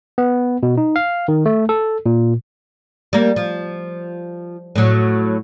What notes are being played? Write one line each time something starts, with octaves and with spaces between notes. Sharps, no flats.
B3
B2
D#4
F5
D#3
A3
A4
A#2
G3 A#3
F3
A2 F#3